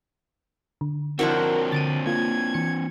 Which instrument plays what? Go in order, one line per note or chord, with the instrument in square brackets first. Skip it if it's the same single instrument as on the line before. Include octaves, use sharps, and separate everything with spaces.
[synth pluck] D3
[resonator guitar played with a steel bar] F3 E4 F#4 [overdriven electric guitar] C4 D4 [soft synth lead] A#4
[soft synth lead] D3 [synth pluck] A6 D7 D#7
[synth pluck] A#3 F4 [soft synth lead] G#6
[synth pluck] E3 C#7